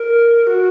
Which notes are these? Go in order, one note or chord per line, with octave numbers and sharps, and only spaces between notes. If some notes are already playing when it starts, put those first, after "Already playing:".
Already playing: A#4
F#4